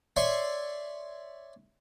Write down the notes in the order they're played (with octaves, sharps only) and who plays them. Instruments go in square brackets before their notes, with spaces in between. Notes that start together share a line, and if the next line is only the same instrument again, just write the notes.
[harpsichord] C#5 D5 E5 G#5 C6 C#6